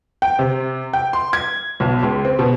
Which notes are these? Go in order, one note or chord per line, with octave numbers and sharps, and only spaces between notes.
G5
C3
G5
C6
G#6
B1
C#2
C4
B2